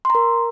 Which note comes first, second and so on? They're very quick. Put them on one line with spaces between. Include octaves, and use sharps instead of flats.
C6 A#5 A#4